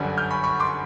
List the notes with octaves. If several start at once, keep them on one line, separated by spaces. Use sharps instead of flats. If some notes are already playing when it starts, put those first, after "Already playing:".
Already playing: G1 F#2 D3 G3
F6 G6
B5 C#6
B5 C#6
C6 D6